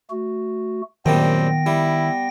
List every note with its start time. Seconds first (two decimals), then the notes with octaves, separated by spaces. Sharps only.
0.10 A3 F#4
1.06 F#2 A#2 D#3 G3 B3 C4 G5 A#6
1.66 G3 E4